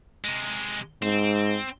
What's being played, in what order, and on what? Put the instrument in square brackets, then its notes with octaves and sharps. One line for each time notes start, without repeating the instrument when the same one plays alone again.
[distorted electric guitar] C3 G#3
[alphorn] G#2 [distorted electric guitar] C4